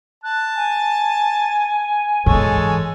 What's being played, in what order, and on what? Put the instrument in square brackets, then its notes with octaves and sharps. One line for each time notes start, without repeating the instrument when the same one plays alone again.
[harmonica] A5 [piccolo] F#6
[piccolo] G#5
[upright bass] G#2 E3 [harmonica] G#3 A4 C#5